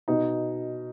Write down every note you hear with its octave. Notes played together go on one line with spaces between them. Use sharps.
B2 D#4